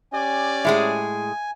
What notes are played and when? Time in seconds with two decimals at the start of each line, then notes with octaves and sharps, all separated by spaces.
0.13 C#4 G4 D5 G#5
0.65 A2 G#3 G#4 E5 F#5